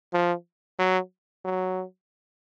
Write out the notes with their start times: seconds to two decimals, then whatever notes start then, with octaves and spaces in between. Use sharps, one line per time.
0.13 F3
0.79 F#3
1.45 F#3